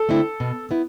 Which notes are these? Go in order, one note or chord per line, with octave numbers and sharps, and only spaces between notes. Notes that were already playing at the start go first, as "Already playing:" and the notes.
Already playing: A4
D3 A3 C4 E4
B2
B3 E4